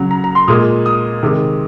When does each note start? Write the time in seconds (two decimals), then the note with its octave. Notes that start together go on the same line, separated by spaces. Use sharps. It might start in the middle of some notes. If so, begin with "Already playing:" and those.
Already playing: C#3 F#3
0.11 A#5
0.24 A#5
0.35 C6
0.48 A#2 G#3 D#6
0.86 D#6
1.23 C3 D#3 G#3